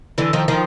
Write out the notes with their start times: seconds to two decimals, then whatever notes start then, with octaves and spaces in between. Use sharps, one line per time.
0.18 D3 E3
0.33 D#3 F3
0.48 D#3 F3